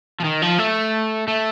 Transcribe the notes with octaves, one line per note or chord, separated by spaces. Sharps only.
F3
D#3
F3
A3
A3